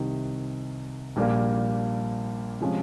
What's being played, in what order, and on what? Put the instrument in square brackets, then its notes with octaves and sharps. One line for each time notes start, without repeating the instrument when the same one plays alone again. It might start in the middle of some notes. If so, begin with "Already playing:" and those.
Already playing: [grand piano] C2 C3 D#3
A#1 A#2 G3 A#3
C3 F3 G#3 C#4